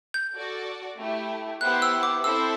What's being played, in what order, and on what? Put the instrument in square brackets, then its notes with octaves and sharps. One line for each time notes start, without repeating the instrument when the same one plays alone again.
[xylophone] G6
[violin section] F#4 A4 D5
A3 E4 G4
[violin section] B3 E4 G4 C5 F#5 [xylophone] F#6
[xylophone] E6
D6
[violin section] C4 E4 A4 C5 [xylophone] E6